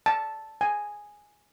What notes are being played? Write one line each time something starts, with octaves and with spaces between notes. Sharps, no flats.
A5
G#5